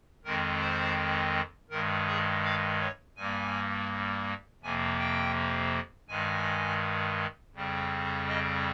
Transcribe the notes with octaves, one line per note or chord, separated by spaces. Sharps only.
F2 D#3 G#3 C4 A#4
C5
G2 D#3 G#3 A#4
G#4
F5
C#5
G2 G3 A#3 G#5
F2 C3 F3 A#3 G#5
G5
G2 D#3 G#3 G#5
F2 C#3 G3 C4
D#5